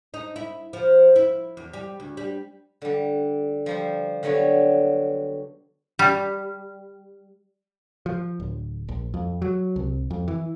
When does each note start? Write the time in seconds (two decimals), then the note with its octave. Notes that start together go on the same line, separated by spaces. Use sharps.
0.14 D#4
0.36 E4
0.73 F3
1.16 E4
1.57 E2
1.73 G3
2.00 D2
2.17 G3
2.82 D3 G3
3.66 F3 G3 C5
4.23 D3 F#3 G3 B3 C#5
5.99 G3
8.06 F3
8.40 D1
8.88 A#1
9.14 F2
9.42 F#3
9.76 C2
10.11 F2
10.28 E3